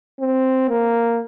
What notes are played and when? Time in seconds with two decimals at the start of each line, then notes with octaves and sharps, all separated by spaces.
0.20 C4
0.69 A#3